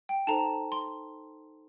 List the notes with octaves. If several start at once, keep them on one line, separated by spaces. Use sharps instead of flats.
G5
D#4 A4 C5 A5 A#5
C6